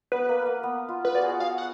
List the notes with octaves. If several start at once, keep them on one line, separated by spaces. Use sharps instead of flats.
B3 B4
A#3
A#3
B3
F4
B4
F#4 D5
G#4
F#4
G#4 F5
F#5